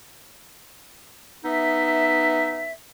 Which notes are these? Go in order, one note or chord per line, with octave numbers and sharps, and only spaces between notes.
B3 D#4 E5